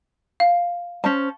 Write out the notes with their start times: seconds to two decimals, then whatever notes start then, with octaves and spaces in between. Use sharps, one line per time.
0.40 F5
1.04 C#4 C5 A5